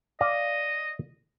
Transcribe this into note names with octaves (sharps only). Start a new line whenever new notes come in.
D5 D#5 F5